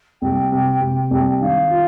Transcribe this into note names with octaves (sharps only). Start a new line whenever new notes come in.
C2 G5
C3
C3
C2
D#3 F5
F4